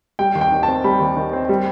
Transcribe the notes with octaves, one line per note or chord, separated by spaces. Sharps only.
G3 G5
D#2
G5
D#3
A5
C4
G3 B5
D#2
D#3
C4
G3